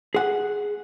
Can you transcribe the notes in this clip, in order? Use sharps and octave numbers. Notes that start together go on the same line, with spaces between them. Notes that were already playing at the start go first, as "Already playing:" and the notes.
G#4 F#5